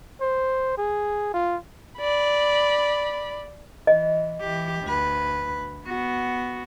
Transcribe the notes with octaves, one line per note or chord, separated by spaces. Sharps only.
C5
G#4
F4
D5 B5
E3 D#5
E3 G4
D2 B4
B3 F#4